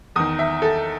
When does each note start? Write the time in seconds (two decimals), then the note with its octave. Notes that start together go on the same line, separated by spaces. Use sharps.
0.16 E2 D#3 D#6
0.39 E5
0.62 A4